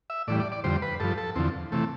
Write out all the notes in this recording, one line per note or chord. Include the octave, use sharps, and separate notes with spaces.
E5
A2 E3 G3 D5
D5
D5
F2 D3 G3 C5
B4
G2 F3 A4
A4
E2 D3 F3 C4
C3 E3 A3